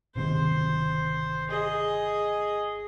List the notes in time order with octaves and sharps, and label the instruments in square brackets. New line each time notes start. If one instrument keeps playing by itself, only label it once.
[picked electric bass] G1 C3 D#3 [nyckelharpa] C5
[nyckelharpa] G#4 D#5